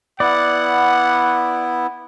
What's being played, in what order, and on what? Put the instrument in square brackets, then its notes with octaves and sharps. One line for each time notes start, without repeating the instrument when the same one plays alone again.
[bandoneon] B3 E4 [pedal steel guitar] D5 [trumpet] F#5